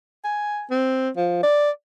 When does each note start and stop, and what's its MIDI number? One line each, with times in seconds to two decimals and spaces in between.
0.24 0.65 80
0.70 1.10 60
1.17 1.38 53
1.43 1.70 74